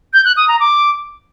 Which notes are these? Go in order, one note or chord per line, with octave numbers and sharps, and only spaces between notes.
G6
F#6
D#6
A#5
D6